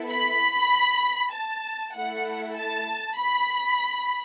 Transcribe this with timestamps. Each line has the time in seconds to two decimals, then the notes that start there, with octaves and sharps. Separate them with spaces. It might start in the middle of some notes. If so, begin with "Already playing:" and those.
Already playing: B3 E4 A4
0.11 B5
1.33 A5
1.94 A3 E4 A4 F#5
2.56 A5
3.17 B5